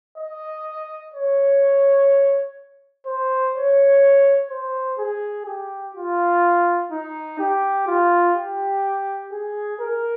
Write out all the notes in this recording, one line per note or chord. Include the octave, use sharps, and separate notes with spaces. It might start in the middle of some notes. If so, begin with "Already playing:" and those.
D#5
C#5
C5
C#5
C5
G#4
G4
F4
D#4
G4
F4
G4
G#4
A#4